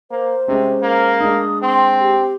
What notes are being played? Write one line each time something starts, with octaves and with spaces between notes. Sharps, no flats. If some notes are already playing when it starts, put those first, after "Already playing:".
A#3 C5
C3 G#3 C#4
A#3
G#3 D4 D#6
C4 C6
G4